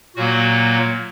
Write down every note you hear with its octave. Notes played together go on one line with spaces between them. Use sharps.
A#2 F#3 A#3 F#4